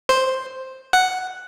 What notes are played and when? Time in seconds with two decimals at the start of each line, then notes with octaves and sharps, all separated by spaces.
0.09 C5
0.93 F#5